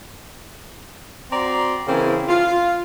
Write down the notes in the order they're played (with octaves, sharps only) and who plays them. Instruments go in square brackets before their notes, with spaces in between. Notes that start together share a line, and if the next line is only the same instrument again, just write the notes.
[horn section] C4 F#4 D5 A#5 C6
C#3 E3 A#3 C4 E4
F4